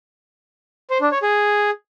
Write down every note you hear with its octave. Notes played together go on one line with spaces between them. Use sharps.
C5
D4
C#5
G#4